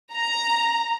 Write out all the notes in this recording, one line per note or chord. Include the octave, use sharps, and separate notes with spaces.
A#5